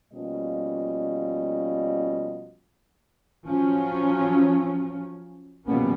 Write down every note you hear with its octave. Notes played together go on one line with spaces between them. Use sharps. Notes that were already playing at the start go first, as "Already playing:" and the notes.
B2 F3 G3 A#3 C#4 D#5
F3 F#3 C#4
B2 F3 G3 A#3 B3 C#4